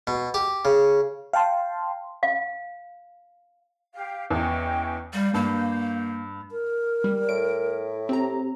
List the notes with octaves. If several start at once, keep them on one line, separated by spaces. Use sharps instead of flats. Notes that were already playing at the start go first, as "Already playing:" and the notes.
B2
G4
C#3
F5 G5 A5 C6
F5
G4 F5
E2 C#4 D#5 G5
G3 F5 G6
G2 A#3
A#4
G3
A2 D7
C4 G4 A#5